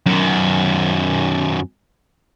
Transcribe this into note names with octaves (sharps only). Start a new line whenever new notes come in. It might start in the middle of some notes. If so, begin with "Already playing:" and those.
F#2 D#3